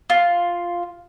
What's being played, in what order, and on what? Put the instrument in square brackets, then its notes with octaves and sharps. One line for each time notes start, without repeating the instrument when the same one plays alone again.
[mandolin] F4